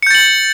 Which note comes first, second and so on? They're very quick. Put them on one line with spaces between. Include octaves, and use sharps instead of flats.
C#7 G6 A6 F#7